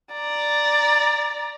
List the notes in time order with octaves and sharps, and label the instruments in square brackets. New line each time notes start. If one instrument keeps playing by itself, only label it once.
[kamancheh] D5 A#5